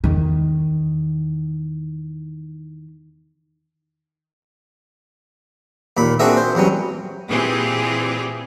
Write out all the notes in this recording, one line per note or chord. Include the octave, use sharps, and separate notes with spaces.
E2 D#3
D#2 A#2 B5
C4 D4 F#4 G#4 A#4 E5
C5
E2 F#3 G3 C#4
A#2 E3 C4 G4 G#4